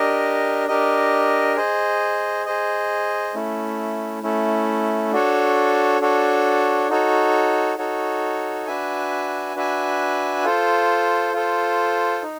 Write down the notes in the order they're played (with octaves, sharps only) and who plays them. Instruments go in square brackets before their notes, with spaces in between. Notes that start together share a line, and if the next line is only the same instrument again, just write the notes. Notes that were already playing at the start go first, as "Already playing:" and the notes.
Already playing: [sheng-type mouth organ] D4 G4 A#4 D#5
D4 G4 A#4 D#5
G#4 C5 D#5
G#4 C5 D#5
A3 C#4 E4
A3 C#4 E4
D4 F#4 A4 C#5
D4 F#4 A4 C#5
D#4 F#4 A4 C#5
D#4 F#4 A4 C#5
D4 F#4 B4 E5 G#5
D4 F#4 B4 E5 G#5
F4 A4 C5
F4 A4 C5
D#4